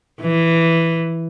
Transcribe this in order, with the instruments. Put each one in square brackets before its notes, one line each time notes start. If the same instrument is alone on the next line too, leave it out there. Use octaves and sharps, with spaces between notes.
[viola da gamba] E3